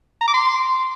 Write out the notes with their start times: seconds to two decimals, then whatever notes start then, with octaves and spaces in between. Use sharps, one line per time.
0.21 A#5
0.28 D6
0.34 C6